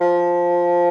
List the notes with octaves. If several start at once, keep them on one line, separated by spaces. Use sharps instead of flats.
F3